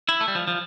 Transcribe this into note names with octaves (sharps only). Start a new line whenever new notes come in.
E4
A3
G3
F3
F3